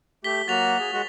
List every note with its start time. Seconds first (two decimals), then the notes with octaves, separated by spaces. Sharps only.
0.24 A3 G4 B6 G7
0.48 F#3 A#3 F#4 A6 F7
0.79 G#4
0.93 G#3 F#4